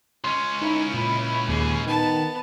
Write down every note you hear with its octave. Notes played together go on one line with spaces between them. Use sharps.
C#2 C#4 C6
D#4 E4
A#2 B5
D#2 G#4
D#3 B3 A5